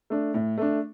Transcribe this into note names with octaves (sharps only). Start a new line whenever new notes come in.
A3 D4
A2
A3 D4